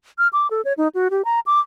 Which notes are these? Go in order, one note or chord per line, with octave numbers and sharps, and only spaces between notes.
F6
D6
A4
C#5
D#4
F#4
G4
A#5
D6